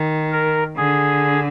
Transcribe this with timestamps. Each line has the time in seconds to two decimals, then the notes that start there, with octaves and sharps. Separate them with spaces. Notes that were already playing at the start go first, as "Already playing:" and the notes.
Already playing: D#3
0.32 A#4
0.77 D3 G#4